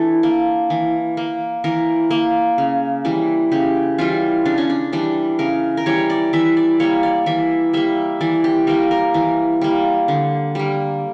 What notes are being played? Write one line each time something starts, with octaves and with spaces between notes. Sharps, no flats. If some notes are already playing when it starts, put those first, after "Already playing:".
Already playing: E3 D4 E4 A4
A#3
E3
A#3
E3 A#4
A#3
C#3
E3 G3
C#3 G4
E3 G3 F4
C#3 D4
C#4
D4
E3 G3 D4
C#3 A#4
A#4
E3 G3 C#5
D5
E3 E5
D5
G3 A#3 C#5
D5
E3 E5
G3 A#3 E5
E3 D5
G4
G3 A#3 A#4
A#4
E3
G3 A#3
D3
G3 A#3